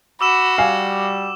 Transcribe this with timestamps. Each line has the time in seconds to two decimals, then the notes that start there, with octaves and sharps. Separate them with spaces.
0.21 F#4 B5 D6 E6 E7
0.58 G3 F5 G#5